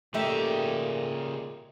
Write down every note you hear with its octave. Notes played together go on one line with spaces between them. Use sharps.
A#2 C#3 A3 D#4 G4 E5